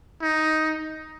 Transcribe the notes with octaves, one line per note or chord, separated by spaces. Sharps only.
D#4